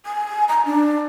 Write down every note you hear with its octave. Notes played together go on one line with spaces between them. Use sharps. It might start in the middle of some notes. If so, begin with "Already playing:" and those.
G#5
A#5
D4